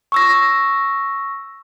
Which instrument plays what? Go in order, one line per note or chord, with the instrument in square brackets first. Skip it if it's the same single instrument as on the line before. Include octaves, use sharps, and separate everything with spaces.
[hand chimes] C#6 E6 A#6